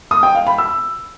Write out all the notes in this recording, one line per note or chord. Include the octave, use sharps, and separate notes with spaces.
D#6
G5
F5
B5
E6